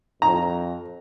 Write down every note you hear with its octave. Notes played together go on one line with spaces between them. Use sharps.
F2 A#5